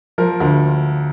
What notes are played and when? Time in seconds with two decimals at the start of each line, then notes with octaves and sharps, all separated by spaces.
0.18 F3 A#4
0.40 D2